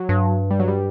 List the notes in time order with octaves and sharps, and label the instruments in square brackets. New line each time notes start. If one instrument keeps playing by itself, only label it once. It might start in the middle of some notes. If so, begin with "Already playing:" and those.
Already playing: [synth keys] F#3
[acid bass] G2
[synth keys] G3
F#3
G3